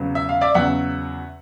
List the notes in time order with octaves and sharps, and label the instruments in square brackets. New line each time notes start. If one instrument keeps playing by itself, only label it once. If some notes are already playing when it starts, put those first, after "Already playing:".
Already playing: [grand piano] E2 C#3 F#3
E5
F5
D5 E5
E2 C#3 F#3 E5 F#5